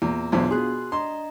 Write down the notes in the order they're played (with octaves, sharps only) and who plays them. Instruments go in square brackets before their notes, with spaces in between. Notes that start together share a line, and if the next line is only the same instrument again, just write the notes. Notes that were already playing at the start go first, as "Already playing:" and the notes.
[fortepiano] E2 A#2 [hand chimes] A#5
[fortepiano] B1 E2 C5 [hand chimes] B3 D4 F4
[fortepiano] B2 G#4 [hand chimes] C6 F#6
[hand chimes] D4 D#5 A#5 [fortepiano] C6